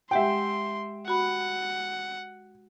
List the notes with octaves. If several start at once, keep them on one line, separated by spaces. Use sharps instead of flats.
G#3 G4 E5 F#5 G5 C6
F#4 F#5 B5